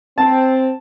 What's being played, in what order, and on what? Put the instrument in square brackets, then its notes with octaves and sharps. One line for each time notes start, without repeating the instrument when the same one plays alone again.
[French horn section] C4 [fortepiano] A5